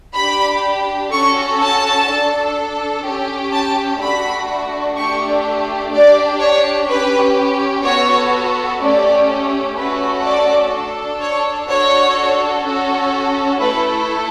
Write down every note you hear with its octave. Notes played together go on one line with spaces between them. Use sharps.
D4 G4 B5
C#4 F#4 A4 C#6
A5
D4 A4
C#4 G4
A5
A3 D4 F#4 B5
A3 D4 G4 C#6
D4 G4 D5
C#5
C#4 G4 B4
B3 F#4 A4 C#5
A3 C#4 G4 D5
A3 C#4 F#4 A4 B4
D5
D4 A4
C#5
D4 F#4 A4 C#5
C#4 F#4 A4
A3 E4 A4 B4